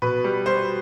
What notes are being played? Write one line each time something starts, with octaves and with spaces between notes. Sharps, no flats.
B2 B4
G3
G3 C5